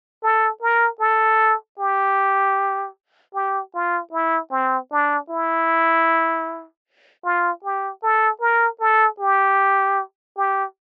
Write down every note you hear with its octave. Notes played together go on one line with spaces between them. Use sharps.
A4
A#4
A4
G4
G4
F4
E4
C4
D4
E4
F4
G4
A4
A#4
A4
G4
G4